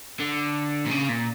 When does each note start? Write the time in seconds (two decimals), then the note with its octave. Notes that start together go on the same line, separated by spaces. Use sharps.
0.20 D3
0.86 A#2
0.91 C#3
1.09 A#2